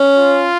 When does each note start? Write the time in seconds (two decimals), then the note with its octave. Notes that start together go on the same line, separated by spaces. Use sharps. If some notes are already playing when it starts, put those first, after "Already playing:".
Already playing: C#4
0.16 F4